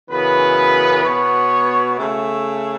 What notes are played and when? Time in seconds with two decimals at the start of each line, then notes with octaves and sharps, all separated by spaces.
0.10 F#2 C#3 E3 B3 B4
1.03 B2 B3 C#5
1.97 C#3 A3 E5